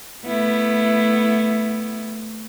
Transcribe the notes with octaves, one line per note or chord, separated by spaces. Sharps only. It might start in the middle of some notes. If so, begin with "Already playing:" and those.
A3 B3 E4